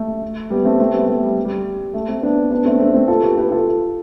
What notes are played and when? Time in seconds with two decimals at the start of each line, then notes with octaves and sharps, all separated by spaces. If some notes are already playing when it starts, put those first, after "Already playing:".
Already playing: A3
0.50 G3 B3
0.65 A3 C4
0.80 A3 C4
0.93 G3 B3
1.07 A3
1.22 G3
1.45 G3
1.94 A3
2.08 A3 C4
2.22 B3 D4
2.51 B3 D4
2.65 A3 C4
2.75 D4
2.80 A3 C4
2.94 A3 C4
3.08 F4 A4
3.22 G4 B4
3.38 G4 B4
3.51 F4 A4